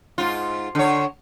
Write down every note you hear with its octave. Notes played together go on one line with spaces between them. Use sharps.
G#2 F4
D3 C#5